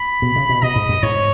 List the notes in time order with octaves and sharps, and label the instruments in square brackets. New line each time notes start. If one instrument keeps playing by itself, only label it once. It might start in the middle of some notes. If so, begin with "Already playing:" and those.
Already playing: [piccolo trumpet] B5
[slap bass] B2
C#3
B2
[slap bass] B2 [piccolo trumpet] D#5
[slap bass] G#2
F#2
[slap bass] G#2 [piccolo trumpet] C#5